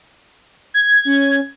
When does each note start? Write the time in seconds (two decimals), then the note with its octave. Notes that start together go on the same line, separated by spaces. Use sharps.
0.74 G#6
1.05 C#4